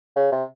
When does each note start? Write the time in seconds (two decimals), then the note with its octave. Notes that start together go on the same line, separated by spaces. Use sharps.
0.16 C#3
0.32 C3